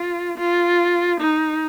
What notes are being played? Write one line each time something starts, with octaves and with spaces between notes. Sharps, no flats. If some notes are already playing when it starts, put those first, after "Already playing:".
Already playing: F4
F4
D#4